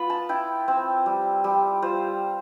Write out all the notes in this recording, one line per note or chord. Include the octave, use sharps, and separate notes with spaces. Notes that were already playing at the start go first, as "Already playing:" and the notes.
Already playing: B3 F4 B5
A5
E4 G5
C4
G3
G3
F4 C5